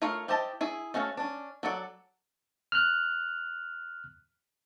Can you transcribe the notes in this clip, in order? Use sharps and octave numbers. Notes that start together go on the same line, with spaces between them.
A3 F4 A#4 C#5 F5
E4 G4 C5 D#5 A5
E4 G#4
A3 C#4 F#4 F5 A5
C#4 D4
F#3 A4 D5 F#5
F6 F#6